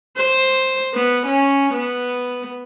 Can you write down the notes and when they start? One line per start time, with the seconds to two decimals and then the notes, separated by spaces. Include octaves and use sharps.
0.17 C5
0.94 B3
1.26 C#4
1.73 B3